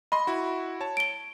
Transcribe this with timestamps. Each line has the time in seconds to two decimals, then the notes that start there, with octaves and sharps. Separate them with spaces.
0.12 D#5 B5 C6
0.27 E4 F#4
0.80 C#5 A5
0.97 D7 G7